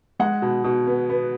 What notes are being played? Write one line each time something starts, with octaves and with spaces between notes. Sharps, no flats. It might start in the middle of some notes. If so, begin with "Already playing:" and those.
G#3 F#5
B2
B2
B3
B3